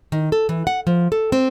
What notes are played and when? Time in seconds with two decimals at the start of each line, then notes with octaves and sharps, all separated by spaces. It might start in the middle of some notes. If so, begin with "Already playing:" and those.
0.12 D#3
0.32 A4
0.49 E3
0.67 F#5
0.87 F3
1.12 A4
1.32 C4